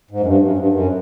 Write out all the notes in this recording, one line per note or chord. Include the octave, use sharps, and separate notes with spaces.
G#2
F#2
G2
F#2
G2
F#2